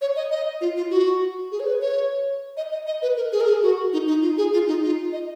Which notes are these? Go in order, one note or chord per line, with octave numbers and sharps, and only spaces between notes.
C#5
D#5
D#5
F4
F4
F#4
G#4
C#5
B4
C#5
D#5
D#5
D#5
B4
A#4
G#4
A#4
G#4
F#4
D#4
D#4
F4
G#4
F4
D#4
F4
D#5